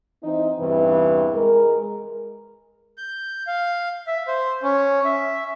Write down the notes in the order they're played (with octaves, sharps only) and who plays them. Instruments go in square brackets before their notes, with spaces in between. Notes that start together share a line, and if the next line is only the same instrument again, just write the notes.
[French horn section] E3 C4 D#4
E2 G2 C3 E3
G#3 A#4
[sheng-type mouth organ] G6
F5
E5
C5
C#4
E5